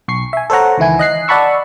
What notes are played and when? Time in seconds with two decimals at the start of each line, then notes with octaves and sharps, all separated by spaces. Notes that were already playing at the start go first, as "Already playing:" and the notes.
0.08 B1 C#6 C7
0.33 E5 G#5
0.50 A4 C5 C#5 F#5 A#5
0.78 C#2 D#3 E3 E4 G#5
0.99 D#5 F#6 C7
1.28 D5 F#5 A5 B5 C#6 E6